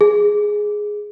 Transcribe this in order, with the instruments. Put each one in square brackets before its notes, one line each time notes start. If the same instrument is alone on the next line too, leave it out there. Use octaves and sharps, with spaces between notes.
[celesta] G#4